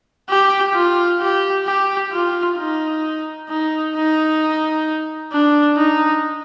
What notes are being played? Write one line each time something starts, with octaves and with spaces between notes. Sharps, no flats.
G4
F4
G4
G4
F4
D#4
D#4
D#4
D4
D#4